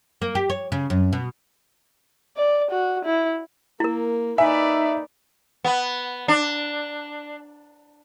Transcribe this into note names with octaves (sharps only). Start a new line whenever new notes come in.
A#3
G4
C#5
C#3
F#2
B2
D5
F#4
E4
A#3 E4 A#4
D#4 B4 D5 E5 G#5
B3
D4